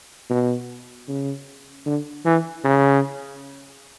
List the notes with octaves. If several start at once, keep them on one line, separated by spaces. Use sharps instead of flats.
B2
C#3
D3
E3
C#3